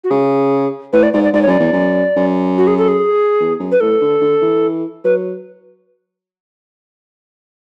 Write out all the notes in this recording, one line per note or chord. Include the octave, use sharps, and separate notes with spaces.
F#4
C#3 G#4
A2 B4
D5
G#2 D5
D5
G#2 D5
C#5
F#2 D5
E2
F#2
F#2
F#4
G#4
A4
G#4
E2
F#2
B4
A2 A4
D3
D3
E3
F#3 B4